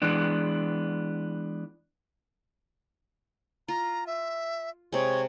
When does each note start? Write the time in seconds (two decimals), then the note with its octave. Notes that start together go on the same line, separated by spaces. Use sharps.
0.02 E3 G#3 B3 D4
3.68 F4 A#5
4.07 E5
4.92 C3 G#3 C#5